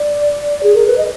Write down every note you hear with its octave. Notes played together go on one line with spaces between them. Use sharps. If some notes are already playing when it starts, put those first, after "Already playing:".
Already playing: D5
G#4
A#4
B4
D#5